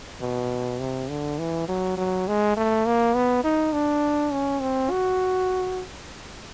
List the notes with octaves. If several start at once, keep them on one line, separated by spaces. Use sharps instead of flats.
B2
C3
D3
E3
F#3
F#3
G#3
A3
A#3
B3
D#4
D4
C#4
C4
F#4